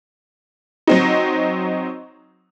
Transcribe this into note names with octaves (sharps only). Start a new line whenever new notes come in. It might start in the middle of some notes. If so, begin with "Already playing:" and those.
F#3 C4 D#4